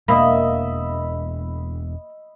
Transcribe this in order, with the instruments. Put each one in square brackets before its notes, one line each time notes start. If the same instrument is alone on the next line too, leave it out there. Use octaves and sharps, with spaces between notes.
[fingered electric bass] E1 B2 D4 [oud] A#3 [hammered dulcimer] D#5 E5 B5